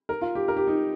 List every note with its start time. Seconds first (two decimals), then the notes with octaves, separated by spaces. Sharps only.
0.09 A#4
0.21 F4
0.35 G4
0.48 A#4
0.57 G4
0.67 D#4